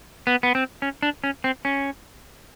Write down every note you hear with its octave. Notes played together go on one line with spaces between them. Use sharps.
B3
B3
C4
C#4
D4
C#4
C4
C#4